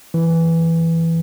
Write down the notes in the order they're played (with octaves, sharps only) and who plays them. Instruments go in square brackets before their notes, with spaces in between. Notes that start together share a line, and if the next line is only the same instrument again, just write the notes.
[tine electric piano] E3